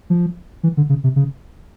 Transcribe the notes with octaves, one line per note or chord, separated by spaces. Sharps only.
F3
E3
D3
C#3
C3
C#3